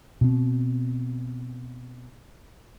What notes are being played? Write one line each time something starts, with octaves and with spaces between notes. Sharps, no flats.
B2 C4